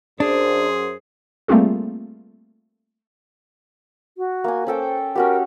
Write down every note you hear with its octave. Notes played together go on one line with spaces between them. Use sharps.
F#2 D4 G#4 C5
G3 A3 A#3 C4 F4 G#4
F#4
A#3 G#5
C#4 A4 C5 G5
C#4 F#4 G4 A#4